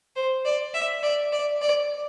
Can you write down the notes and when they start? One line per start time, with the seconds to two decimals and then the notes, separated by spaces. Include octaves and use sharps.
0.16 C5
0.45 D5
0.74 E5
1.03 D5
1.32 D5
1.62 D5